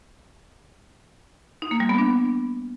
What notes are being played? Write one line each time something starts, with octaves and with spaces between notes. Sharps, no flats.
D#4
A#3
G3
B3
D4